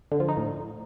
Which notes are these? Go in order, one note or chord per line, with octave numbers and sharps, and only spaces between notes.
D3
F3
D#4
A2